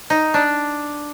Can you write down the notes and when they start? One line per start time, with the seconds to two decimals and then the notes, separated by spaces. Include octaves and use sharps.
0.10 D#4
0.34 D4